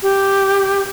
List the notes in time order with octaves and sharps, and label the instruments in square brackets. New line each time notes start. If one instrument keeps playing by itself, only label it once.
[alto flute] G4